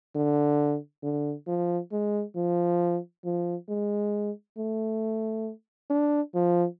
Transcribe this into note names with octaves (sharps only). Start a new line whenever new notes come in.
D3
D3
F3
G#3
F3
F3
G#3
A3
D4
F3